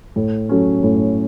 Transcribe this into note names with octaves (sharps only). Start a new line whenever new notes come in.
A2
F#3 A3 C#4
A2